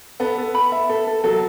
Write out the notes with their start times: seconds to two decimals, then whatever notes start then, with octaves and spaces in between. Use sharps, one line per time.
0.20 B3 A4
0.38 A4
0.55 B5
0.72 E5
0.90 A4
1.07 A4
1.24 F#3 A4